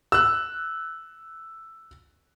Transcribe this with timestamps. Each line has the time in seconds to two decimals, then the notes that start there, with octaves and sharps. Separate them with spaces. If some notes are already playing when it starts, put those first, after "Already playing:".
0.12 E6 F#6